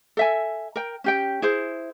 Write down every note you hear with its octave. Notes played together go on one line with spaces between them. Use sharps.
A4 E5 G#5
A#4 G5
C#4 G4 G5
E4 G#4 C5